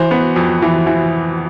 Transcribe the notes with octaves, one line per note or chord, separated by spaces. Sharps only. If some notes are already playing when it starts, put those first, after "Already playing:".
Already playing: E3 C5
B3
F2
E3
E3